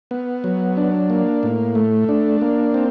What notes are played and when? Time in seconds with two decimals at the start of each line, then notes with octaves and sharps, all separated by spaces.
0.11 B3
0.44 F#3
0.77 D4
1.10 A#3
1.43 A2
1.75 A3
2.09 D4
2.41 A#3
2.74 C4